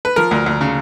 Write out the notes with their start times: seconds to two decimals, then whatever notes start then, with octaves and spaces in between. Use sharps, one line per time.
0.05 B4
0.16 F3 A#4
0.31 D2
0.46 D2
0.61 C#3